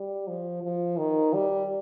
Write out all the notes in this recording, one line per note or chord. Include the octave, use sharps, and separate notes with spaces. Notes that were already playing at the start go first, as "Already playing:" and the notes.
Already playing: G3
F3
F3
D#3
G3